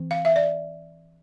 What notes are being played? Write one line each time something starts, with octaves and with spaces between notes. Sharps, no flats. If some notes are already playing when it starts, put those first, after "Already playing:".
Already playing: E3 C4
F5
E5
D5